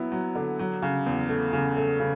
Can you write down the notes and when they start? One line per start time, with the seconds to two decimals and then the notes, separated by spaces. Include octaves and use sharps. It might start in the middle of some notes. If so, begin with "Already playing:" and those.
Already playing: F#3 B3 E4
0.12 F#3
0.35 D3
0.59 F#3
0.82 C#3
1.06 E2
1.29 A3
1.53 C#3
1.77 A3
2.00 C#3